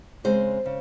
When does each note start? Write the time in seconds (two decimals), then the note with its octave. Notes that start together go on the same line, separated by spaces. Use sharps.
0.24 C#3 G#3 C4 C5
0.66 C#3